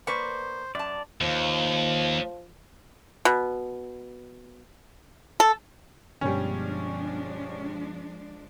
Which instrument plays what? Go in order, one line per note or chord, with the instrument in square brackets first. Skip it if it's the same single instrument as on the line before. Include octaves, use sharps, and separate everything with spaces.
[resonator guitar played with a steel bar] A#3 B4 D5 [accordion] C5 [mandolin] C#6
[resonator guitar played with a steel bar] F#2 A5 [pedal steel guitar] D5
[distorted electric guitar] D#2 [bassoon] F3
[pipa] B2
A4
[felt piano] G1 B2 [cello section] F3 G#3 D4 [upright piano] G3 C#4